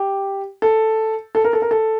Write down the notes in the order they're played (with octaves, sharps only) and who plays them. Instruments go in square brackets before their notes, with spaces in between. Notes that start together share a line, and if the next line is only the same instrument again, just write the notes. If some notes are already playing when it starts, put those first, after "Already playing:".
Already playing: [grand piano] G4
A4
A4
A#4
A4
A#4
A4